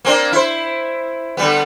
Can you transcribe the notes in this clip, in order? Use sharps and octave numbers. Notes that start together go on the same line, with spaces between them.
A#3 C4 D4
E4 C5
D3 G3 B3